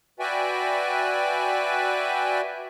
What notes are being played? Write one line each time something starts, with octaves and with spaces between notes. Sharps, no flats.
F#4 B4 D5 E5 G5 G#5